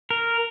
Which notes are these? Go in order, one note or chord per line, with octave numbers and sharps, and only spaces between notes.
A#4